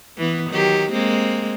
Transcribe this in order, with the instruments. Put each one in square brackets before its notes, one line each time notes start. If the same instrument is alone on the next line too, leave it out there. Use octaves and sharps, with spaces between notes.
[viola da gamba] E3 B3
D#3 F#3 G4
G#3 A#3 C4